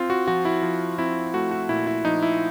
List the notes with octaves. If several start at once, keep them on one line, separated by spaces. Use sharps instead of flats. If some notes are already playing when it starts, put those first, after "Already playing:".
Already playing: C4 F4
F#4
F3 F#4
E4
F3
C4 E4
A3 F#4
F#4
A#2 E4
E4
F3 D#4
E4